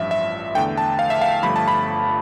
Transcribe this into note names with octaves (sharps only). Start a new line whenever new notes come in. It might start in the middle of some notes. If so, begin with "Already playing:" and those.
Already playing: A1 G2 F3 E5
E5
E2 D3 A3 G5
A5
F5
E5
F5
G1 G2 F3 A3 B5
A5
B5